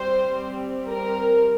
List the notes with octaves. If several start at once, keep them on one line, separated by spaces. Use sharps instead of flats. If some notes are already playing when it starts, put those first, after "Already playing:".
Already playing: G3 C4 C5
A#4